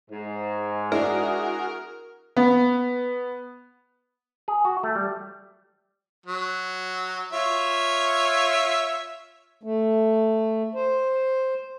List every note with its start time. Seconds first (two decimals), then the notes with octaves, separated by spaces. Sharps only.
0.10 G#2
0.92 G#3 D4 E4 F#4 G#4 A#4
2.37 B3
4.48 G#4
4.65 F#4
4.83 A3
4.96 G3
6.26 F#3
7.33 F4 C#5 E5
9.63 A3
10.75 C5